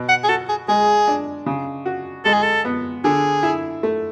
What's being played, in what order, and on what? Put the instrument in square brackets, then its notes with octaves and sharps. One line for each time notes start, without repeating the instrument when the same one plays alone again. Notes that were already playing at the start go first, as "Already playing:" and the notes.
Already playing: [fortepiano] B2
[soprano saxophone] F#5
G#4
[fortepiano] F#4 [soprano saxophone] A4
[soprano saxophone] G#4
[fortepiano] G#3 [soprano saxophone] G#4
[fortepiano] D4
C#3
F#4
[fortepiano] G#3 [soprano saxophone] A4
[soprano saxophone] G#4
A4
[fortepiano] B3
[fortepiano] D3 [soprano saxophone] G#4
[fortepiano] E4
A3